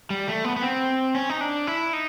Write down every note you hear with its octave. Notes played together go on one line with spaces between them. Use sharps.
G3
A3
B3
B3
C4
C#4
D#4
D4
E4
D#4